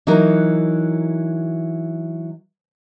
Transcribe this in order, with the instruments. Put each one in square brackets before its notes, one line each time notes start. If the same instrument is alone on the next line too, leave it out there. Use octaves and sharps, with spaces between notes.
[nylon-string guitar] E3 F#3 D#4 F#4 A#4